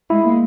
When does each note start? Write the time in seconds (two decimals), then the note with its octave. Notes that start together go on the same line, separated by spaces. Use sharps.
0.10 G#3 E4
0.25 A#3